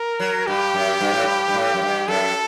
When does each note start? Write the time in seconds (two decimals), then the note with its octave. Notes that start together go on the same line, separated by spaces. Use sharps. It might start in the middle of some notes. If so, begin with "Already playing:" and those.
Already playing: A#4
0.20 F#3
0.47 G2 G4
0.74 F#2
1.01 G2
1.13 A2
1.23 G2
1.48 G2
1.54 A2
1.74 F#2
1.82 G2
2.08 F#2 A4